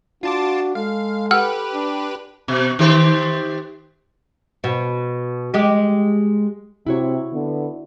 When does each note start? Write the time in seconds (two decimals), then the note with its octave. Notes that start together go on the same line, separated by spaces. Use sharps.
0.23 D4 F4 F#4 A5 D6
0.75 G#3 A4 F5
1.31 G4 B4 F#5 E6 F6
1.73 D4
2.48 B2
2.79 D#3 G4 C5
4.64 B2
5.54 G#3 G4
6.87 C3 E4 F#4 C#5
7.33 D3 B3